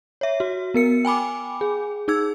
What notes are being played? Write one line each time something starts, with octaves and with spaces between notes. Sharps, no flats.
C#5 E5
F#4
B3 A#4 C#7
G5 G#5 B5 D6
G#4
D#4 G#4 E6 G#6